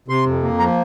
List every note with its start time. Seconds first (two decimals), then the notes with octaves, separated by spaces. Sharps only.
0.08 C3 C6
0.26 F2
0.43 A#3
0.59 F3 A#5